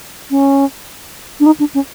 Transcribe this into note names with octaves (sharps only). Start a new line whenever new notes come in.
C#4
D4
D#4
D4
C#4